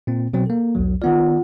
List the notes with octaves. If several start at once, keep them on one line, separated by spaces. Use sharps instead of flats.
A#2 C4
B2 F#3 C4
A#3 A4
B1 E2 F#3
D#3 B3 F4 D5 F#5